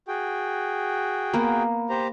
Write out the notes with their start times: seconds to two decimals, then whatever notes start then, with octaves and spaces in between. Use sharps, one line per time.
0.08 F#4 G#4 G5
1.34 A#3 B3
1.90 G4 C5 A#5